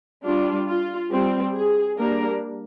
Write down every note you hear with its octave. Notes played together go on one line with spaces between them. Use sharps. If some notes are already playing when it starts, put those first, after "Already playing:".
G3 D4 F4
F4
G3 C4
G#4
G3 A#3 D4 A#4